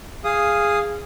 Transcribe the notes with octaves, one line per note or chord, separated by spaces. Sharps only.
G#4 F5 D#6